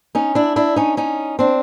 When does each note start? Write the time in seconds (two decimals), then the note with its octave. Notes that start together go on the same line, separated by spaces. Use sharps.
0.15 C#4 D#4
0.35 D4 E4
0.56 D4 E4
0.76 C#4 D#4
0.97 C#4 D#4
1.39 C4 D4